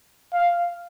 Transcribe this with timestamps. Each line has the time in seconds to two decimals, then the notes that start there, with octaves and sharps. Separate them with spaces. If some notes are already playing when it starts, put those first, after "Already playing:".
0.33 F5